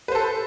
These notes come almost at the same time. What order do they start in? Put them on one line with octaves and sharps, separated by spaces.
B4 C5 A4